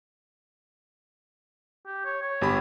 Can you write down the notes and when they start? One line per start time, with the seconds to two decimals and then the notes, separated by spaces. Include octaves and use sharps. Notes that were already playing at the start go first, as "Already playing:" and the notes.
1.86 G4
2.05 C#5
2.22 C#5
2.41 G1 G4 B5